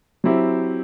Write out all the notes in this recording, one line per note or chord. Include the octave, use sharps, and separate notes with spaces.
F#3 C4 E4 G4